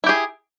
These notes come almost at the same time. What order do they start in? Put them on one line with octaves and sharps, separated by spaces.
E4 G4 G#4